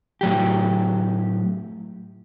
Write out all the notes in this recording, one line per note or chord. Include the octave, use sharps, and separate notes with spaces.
A2 F#3 G4